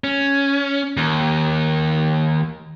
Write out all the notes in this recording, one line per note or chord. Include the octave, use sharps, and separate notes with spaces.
C#4
D#2